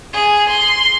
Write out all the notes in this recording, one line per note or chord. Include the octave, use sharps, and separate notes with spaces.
G#4
C6